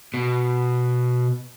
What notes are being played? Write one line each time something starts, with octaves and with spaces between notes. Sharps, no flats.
B2